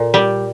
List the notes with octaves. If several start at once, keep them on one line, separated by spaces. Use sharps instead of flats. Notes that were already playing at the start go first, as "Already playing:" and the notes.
Already playing: A#2
G3